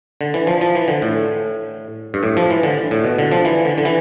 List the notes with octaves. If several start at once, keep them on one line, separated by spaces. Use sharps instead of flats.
D3
E3
F3
F3
E3
D3
A2
G2
A2
F3
E3
D3
A2
B2
D3
F3
E3
D3
D3
E3